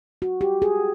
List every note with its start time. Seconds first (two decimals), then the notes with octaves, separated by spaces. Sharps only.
0.22 F#4
0.41 G4
0.62 G#4